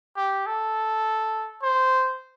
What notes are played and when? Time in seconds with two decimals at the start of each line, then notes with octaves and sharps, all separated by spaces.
0.17 G4
0.46 A4
1.63 C5